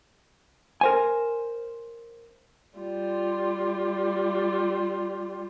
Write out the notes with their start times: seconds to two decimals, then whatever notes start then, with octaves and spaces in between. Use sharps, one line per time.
0.81 A#4 C5 G#5
2.78 G3 F4